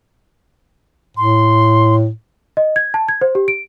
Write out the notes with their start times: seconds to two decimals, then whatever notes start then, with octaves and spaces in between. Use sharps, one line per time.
1.17 A2 C6
2.57 D#5
2.76 G#6
2.94 A5
3.09 G#6
3.21 C5
3.35 G4
3.48 D7